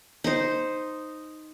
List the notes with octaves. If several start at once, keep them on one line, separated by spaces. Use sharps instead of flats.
D#4 C5